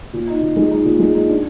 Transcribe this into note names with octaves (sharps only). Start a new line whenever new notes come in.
A#2
D#4
A#2
G#3
D#4
A#2
G#3
D#4
D4